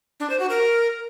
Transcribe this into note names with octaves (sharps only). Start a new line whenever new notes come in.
D4
C5
F#4
A#4